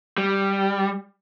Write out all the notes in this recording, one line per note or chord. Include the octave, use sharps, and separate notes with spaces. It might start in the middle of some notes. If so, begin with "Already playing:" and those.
G3